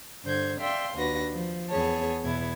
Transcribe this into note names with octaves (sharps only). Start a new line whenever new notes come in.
G2 D3 C5 G6 G#6
D5 E5 F5 G5 C6
D#2 D4 F#4 B4 A#6
F3
E2 B3 G#4 C#5 A5
E2 B2 B3 E4 G#6